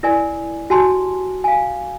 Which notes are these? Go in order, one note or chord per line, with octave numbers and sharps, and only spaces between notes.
E4 A#4 D5 G#5
F#4 G4 G#5 A5 C6
F5 G#5